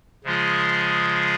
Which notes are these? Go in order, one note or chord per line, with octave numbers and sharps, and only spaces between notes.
C#3 F3 G#3 F4 G#4